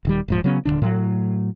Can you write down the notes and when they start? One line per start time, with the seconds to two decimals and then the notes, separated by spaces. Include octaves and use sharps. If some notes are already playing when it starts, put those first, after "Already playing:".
0.05 D#1 D#3 G3
0.28 D#1 G#2 F3
0.44 C#3 F#3 B3 C#4
0.65 D#1 D#2 D3 D4
0.82 A2 F#3